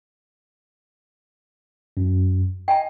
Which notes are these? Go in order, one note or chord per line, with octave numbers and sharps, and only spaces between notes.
F#2
D#5 G5 G#5 A#5